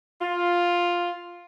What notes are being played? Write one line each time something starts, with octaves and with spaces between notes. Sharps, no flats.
F4